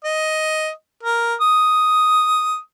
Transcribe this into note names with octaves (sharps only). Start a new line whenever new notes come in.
D#5
A#4
D#6